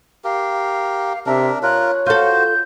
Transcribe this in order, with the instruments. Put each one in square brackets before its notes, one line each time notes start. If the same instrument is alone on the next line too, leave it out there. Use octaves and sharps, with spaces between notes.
[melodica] G4 A#4 [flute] F5
[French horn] C3 [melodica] D4 A#4 [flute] E5
[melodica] F4 A#4 [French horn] C#5 [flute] F#6
[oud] F4 A4 [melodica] F#4 C5 [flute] G6